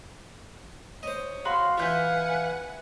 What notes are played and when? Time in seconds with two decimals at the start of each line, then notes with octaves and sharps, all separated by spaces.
1.03 C5 C#5 D#5
1.45 F#4 F5 B5 C6
1.78 E3 F4 B4 E5 F#5 G#5 G6